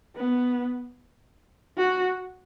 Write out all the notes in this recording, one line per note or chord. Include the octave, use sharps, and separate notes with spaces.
B3
F#4